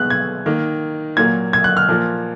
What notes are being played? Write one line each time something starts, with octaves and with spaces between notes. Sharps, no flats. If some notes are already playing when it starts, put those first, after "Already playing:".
Already playing: B2 G#3 B3 F#6
G#6
D#3 A#3
A#2 F#3 A#3 G#6
G#6
F#6
F6
A#2 F3 A#3